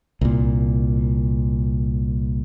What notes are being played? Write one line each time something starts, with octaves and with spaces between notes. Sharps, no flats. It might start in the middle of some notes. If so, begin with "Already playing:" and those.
C2 A#2